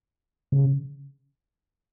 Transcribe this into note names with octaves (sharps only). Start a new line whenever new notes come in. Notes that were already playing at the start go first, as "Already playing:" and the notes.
C#3